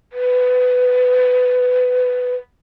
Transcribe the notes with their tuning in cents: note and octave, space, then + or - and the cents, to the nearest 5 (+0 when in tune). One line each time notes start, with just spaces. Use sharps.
B4 +20